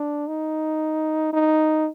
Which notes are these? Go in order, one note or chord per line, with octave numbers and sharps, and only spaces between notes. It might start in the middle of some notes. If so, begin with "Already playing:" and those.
Already playing: D4
D#4
D#4